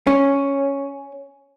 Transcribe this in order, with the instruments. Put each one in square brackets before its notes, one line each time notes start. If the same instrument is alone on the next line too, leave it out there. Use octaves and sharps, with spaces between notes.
[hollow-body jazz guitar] C#4